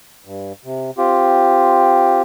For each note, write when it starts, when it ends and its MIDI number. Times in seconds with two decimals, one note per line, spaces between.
0.25 0.53 43
0.64 0.91 48
0.98 2.22 60
0.98 2.22 65
0.98 2.22 67